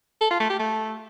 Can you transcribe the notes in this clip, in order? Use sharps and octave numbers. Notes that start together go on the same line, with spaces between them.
A4
F4
A3
G4
A3